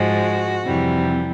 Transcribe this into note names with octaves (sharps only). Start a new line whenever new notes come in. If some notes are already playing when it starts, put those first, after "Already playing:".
Already playing: G#2 F3 G#3 F#4
F2 C3 E3 G3